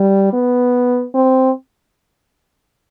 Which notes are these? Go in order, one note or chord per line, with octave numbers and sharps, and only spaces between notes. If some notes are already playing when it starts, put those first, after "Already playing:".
Already playing: G3
B3
C4